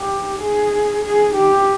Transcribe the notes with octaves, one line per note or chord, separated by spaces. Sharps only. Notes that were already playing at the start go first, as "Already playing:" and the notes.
Already playing: G4
G#4
G#4
G4